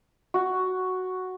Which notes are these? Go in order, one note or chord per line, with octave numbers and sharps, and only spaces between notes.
F#4